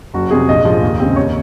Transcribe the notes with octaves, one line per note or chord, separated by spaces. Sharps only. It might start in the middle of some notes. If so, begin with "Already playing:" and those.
F#1 F#4
F2 C3 G#4
A#1 D#5
G#2 F3 G#3
D#2
C#3 G#3 C4
D#2 C#5